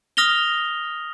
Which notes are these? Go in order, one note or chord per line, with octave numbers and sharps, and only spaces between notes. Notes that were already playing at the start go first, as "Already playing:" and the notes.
D#6 F6 A#6 F7 G7